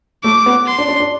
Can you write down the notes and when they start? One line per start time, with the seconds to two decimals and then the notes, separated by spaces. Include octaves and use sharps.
0.24 A3 D6
0.46 B3
0.67 C6
0.78 D4
0.89 D4
1.00 D4